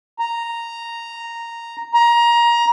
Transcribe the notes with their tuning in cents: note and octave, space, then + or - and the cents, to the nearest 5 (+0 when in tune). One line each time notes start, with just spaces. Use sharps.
A#5 -5
A#5 +20